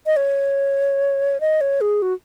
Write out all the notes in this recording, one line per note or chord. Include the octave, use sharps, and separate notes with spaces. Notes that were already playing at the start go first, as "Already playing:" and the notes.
D#5
C#5
D#5
C#5
G#4
F#4